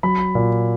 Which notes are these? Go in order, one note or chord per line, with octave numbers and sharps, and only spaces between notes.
F#3 B5
A#2